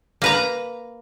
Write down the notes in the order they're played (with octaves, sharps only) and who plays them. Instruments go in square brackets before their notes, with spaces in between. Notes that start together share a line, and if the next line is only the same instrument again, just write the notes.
[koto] A#3 B4 A#5